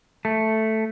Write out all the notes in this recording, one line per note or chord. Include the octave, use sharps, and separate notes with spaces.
A3